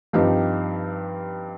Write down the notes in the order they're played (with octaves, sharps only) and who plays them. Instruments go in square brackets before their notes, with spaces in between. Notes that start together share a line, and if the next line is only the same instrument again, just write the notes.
[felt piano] G2 F3 C4 D#4 G4